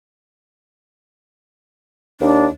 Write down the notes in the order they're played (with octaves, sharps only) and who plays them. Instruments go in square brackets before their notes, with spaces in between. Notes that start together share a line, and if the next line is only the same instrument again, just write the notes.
[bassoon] D#2 [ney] D4